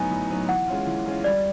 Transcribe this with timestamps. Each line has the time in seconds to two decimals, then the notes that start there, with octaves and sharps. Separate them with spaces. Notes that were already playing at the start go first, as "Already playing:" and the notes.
Already playing: A2 F#3 B3 D#4 G#5
0.10 A2
0.30 F#3 B3 D#4
0.48 E3 F#5
0.68 G#3 C#4 F4
0.86 E3
1.06 G#3 C#4 F4
1.24 G3 D5